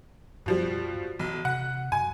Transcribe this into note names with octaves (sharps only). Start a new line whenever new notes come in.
F#2 B2 F3 G3
B1 E3
C3 F#5
F#2 G#5